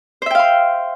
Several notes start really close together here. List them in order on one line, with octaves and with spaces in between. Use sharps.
C5 E5 G5 F5 C6